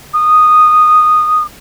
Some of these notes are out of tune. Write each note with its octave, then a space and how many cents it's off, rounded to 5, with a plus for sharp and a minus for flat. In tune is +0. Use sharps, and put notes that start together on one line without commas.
D#6 -10